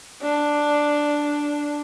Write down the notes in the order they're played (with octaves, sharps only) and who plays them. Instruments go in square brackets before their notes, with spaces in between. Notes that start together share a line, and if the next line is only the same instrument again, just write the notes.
[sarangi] D4